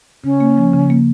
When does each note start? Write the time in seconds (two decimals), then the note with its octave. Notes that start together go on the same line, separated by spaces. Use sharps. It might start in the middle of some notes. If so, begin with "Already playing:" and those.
0.24 C#3 C#4
0.40 A#3
0.58 F3
0.74 C#3
0.90 A#3